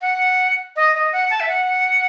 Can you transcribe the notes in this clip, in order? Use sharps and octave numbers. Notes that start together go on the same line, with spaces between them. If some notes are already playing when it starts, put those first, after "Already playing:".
F#5
D#5
D#5
F#5
A5
E5
F#5